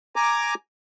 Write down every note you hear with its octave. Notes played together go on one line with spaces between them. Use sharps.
G#5 A#5 D6